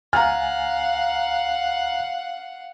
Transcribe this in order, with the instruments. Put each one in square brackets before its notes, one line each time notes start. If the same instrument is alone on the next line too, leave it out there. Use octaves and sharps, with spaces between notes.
[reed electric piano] C#2 G#5 A6 [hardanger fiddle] F5 F#5 [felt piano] A#5 F6